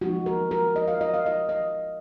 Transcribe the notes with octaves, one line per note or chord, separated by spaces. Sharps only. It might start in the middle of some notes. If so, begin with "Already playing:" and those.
F3 G#3 B3 D#4 F#4
A#4
A#4
D#5
F5
D#5
F5
D#5
D#5